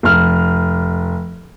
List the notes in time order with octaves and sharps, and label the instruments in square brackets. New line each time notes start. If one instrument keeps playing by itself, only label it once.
[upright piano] F1 F6